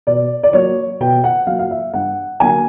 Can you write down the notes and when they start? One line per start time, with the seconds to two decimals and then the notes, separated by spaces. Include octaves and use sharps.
0.07 B2 D5
0.43 D5
0.53 F#3 A#3 C#5
1.00 B2 G5
1.24 F#5
1.47 F#3 A#3 F5
1.59 F5
1.71 E5
1.94 G2 F#5
2.40 D3 F#3 A#3 G#5